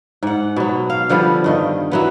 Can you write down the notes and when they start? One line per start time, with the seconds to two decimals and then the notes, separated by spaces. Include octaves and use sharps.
0.23 G#2 F#5
0.56 B2 F#3
0.90 F5
1.09 D3 F3 G3 B3
1.44 G2 D#3 D#5
1.91 E3 F#3 B3